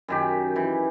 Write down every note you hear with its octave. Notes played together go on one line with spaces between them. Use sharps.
F#2 D#3 G4
E3